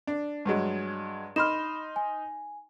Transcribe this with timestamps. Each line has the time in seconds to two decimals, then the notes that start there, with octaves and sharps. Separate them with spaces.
0.07 D4
0.45 G2 F#3 G#3
1.36 D#4 B5 C6 F6 E7
1.96 G#5